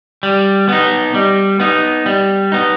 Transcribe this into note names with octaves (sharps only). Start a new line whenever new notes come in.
G3
B3 D#4
G3
B3 D#4
G3
B3 D#4